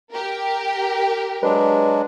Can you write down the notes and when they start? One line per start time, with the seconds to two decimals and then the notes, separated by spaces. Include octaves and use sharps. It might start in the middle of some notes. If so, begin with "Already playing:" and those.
0.11 G4 A#4
1.43 F#3 G#3 D4 B4